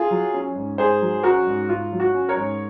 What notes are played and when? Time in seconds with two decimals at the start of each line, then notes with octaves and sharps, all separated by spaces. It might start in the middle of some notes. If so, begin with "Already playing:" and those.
Already playing: F4 G#4
0.11 F#3
0.34 C#4
0.56 G#2
0.78 G#2 G#4 C5
1.01 F#3
1.23 C#4 F#4 A#4
1.47 G#2
1.69 G#2 F4
1.92 F#3
2.00 F#4
2.14 C#4
2.29 A#4 C#5
2.37 G#2